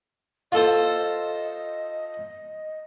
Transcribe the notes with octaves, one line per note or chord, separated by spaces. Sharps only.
F4 A4 C5 D#5